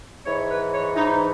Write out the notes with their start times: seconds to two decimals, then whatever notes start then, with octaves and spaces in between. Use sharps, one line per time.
0.25 G#2 E3 C#5
0.49 B4
0.72 C#5
0.95 G#2 E3 D#4